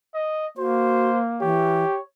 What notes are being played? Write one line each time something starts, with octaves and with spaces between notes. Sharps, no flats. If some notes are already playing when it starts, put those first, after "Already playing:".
D#5
A#3 F#4 C5
E3 G4 C#5